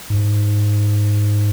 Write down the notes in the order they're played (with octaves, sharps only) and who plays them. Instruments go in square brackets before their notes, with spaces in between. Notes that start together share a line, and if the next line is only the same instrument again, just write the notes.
[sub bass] G#2